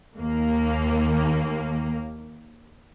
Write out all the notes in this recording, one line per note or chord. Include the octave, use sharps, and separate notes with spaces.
D#2 A#3